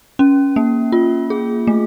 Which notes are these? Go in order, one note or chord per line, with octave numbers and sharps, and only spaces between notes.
C#4
A#3
F4
G#4
A3